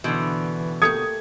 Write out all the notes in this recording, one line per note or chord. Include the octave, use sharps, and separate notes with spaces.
B2 D3 E3 E4 C5
A3 A#3 G4 D#6 G#6 C#7